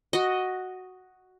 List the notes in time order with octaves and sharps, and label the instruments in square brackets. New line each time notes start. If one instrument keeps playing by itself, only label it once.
[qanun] F#4 D#5